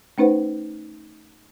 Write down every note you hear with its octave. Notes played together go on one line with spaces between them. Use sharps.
A3 C#4 D#4 B4 C5 F#5